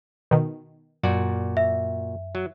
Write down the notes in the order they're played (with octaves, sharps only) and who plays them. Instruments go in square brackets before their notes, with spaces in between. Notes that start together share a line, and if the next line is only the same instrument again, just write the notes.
[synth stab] B2 D#3
[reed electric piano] F#2 [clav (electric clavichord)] A#2 F#4 D5
[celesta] E5
[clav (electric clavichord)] F#3